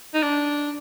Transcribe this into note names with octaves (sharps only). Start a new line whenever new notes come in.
D#4
D4